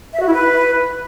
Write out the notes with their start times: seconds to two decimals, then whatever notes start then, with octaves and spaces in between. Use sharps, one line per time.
0.14 E5
0.20 F#4
0.27 E4
0.34 B4